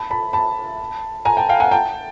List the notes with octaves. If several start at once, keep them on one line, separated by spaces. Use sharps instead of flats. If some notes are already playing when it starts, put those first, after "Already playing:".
Already playing: A5 B5
A5 B5
A5 B5
G#5 A#5
G5 A5
F5 G5
F#5 G#5
G5 A5